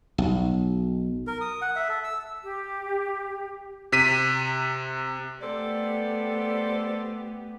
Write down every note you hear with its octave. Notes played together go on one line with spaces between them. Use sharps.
B1
A#4
D#6
F#5
E5
A4
E6
G4
C3 B6 D#7
A3 B3 G4 A4 C5 D5